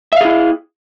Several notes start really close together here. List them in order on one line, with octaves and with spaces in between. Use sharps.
E5 F5 G#4 E4